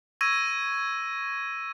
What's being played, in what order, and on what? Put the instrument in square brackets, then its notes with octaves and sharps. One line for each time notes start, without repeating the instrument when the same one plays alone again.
[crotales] C#6 E6 G#6 A#6 D#7